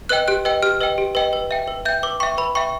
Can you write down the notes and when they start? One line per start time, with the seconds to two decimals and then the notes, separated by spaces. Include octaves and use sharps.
0.09 B4 D#5 G5 F#6
0.28 G4 F#6
0.45 B4 D#5 G5
0.63 G4 F6
0.81 B4 D#5 G5
0.98 G4
1.15 B4 D#5 G5
1.33 B4
1.51 E5 G5
1.68 B4
1.85 E5 G5 G6
2.03 B4 D6
2.20 E5 G5 C#6
2.38 B4 B5
2.55 E5 G5 C#6